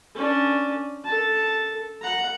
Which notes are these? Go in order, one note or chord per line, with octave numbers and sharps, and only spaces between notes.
C#4 D4
A4 A5
F#5 A#5